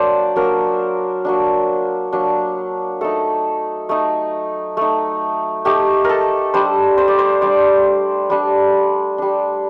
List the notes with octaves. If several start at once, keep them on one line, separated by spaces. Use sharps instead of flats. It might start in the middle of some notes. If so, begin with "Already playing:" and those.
Already playing: F#3 A#3 D4 C5 D5
F#3 A#3 D4 A#4
F#3 A#3 D4
F#3 A#3 D4
A3 D#4 A4
A3 D#4
A3 D#4
A3 D#4 G4
A4 A#4
G3 D4 C5
C5
D5
C5
G3 D4 D5
G3 D4
G3 D4